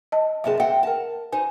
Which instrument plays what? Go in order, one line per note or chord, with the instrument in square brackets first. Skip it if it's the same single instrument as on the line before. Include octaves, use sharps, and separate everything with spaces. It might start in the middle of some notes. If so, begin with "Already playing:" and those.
[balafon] D#5 A5
[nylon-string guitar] F#2 C3 A5 [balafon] G#4 E5
[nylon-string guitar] C4 F#5 G5 [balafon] E5
[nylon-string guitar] A#4 A5
[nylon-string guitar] D#4 C5 [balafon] G#5